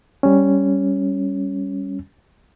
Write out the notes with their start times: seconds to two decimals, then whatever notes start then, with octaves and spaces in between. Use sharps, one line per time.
0.23 G3 C#4